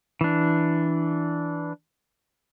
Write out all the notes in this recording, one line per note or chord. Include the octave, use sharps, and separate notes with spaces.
E3 D4